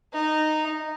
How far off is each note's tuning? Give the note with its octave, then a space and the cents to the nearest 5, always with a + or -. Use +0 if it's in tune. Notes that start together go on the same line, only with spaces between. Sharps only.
D#4 -10